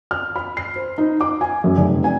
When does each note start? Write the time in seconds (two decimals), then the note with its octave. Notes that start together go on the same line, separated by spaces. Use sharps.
0.11 F6
0.36 B5
0.57 C7
0.76 C5
0.98 D#4
1.21 D6
1.41 G#5
1.64 F#2
1.77 F1
2.04 G#5